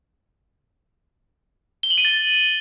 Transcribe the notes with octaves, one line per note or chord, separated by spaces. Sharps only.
G7
F#7
D#7
A6